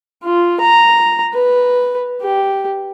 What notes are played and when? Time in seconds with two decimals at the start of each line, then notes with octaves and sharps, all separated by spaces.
0.23 F4
0.61 A#5
1.34 B4
2.22 G4